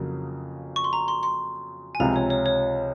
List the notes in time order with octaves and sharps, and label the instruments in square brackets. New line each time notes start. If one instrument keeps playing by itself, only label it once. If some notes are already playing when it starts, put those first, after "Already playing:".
Already playing: [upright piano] F2 C#3 F#3 A#3
[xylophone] C#6
C6
A#5
C6
C6
G#5
[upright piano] C#2 C3 F3 C4 F4 [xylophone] A#5
[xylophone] C#5
C#5
C#5